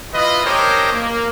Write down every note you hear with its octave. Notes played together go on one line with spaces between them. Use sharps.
E4 F4 B4 D#5
D4 G4 A#4 C5 C#5 D#5
A#3